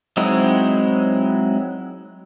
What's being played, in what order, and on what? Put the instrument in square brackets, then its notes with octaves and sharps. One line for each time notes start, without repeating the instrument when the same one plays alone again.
[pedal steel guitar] F#3 G#3 C4 D#4 E4